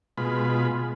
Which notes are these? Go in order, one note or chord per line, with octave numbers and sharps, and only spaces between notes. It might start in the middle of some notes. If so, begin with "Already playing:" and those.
B2 G#3 F4 B5